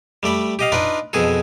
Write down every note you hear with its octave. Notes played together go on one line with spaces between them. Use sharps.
G3 A3 D5 B5
G4 D#5 F5
D4 D#4 F4 B4 D5
F2 B2 G#4 A4